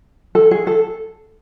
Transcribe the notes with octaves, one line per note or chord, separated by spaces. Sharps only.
A4
G#4
A4